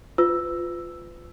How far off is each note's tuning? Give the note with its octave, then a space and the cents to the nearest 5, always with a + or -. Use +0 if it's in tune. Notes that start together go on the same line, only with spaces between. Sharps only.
F4 +0 B4 +30 E6 +0